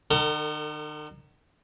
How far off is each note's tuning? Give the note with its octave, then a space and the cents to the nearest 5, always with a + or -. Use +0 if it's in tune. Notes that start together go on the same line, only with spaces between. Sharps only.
D#3 -45 A4 +35 A#5 +0